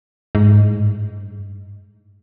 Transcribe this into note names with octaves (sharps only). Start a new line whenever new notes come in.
G#2
A2
G#2
G2